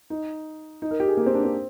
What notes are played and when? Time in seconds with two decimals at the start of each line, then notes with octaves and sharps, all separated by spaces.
0.10 D#4
0.82 D#4
0.91 A#4
1.00 G4
1.08 G#4
1.17 A#3
1.26 C4
1.35 D4
1.45 C4